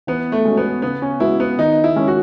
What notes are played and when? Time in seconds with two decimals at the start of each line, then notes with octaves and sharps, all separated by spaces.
0.07 E3 B3
0.32 A3
0.45 G#3 C#4 F#4
0.57 B3
0.82 C#3 B3
1.02 C#4
1.20 G#3 B3 E4 F#4
1.40 B3
1.58 D#3 D#4
1.84 E4
1.96 G#3 C#4
2.08 F#4